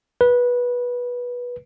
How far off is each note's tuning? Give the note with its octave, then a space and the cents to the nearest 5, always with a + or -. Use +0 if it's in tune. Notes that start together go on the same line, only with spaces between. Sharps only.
B4 -15